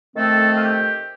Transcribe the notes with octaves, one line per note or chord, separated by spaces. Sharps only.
F2 D#3 A3 C4 A4
F4
G4